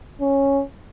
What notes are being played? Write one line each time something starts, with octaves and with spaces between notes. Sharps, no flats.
C#4